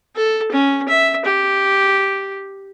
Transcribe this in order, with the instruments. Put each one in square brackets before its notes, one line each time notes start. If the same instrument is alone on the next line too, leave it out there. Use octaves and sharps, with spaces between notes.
[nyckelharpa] A4
C#4
E5
G4